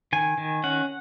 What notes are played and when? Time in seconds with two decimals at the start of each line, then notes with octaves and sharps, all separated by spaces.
0.13 D#3 G#5
0.38 D#3
0.64 C#4 F#5